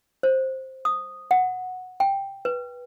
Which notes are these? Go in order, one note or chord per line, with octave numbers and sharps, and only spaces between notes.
C5
D#6
F#5
G5
B4